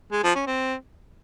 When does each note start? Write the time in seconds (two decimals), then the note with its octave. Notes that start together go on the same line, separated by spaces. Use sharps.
0.12 G#3
0.23 F3
0.35 C#4
0.47 C4